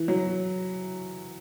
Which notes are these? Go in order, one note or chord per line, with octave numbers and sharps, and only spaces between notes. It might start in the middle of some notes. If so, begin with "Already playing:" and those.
Already playing: E3
F#3